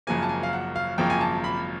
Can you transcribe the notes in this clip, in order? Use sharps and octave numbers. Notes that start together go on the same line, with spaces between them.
G#1 F#2 C#3 F3 A#3 G#5
A5
G#5
F5
F#5
F5
G#1 F#2 C#3 F3 A#3 G5
G#5
A5
B5